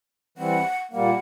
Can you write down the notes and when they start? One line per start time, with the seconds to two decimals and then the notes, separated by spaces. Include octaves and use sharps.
0.38 E3 G3 C4 F#5
0.91 A#2 G3 A#3 F#5